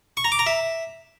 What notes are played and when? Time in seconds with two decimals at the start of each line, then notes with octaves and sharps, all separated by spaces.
0.17 C#6
0.24 A#5
0.32 D6
0.39 A#5
0.47 E5